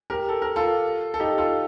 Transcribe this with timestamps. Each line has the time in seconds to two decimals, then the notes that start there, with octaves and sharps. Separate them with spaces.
0.10 G4 A#4
0.29 A4
0.42 A#4
0.56 F4 A4
1.14 A4
1.20 D#4 G4
1.38 F4 A4